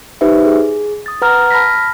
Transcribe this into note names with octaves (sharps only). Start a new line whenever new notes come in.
D#4 G4 B4 C5 E5
G#4
D#6 A6
B4 F#5 A#5 F6
A5 B5 F6 A#6 B6